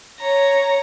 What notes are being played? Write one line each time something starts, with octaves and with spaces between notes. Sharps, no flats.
C#5 A#5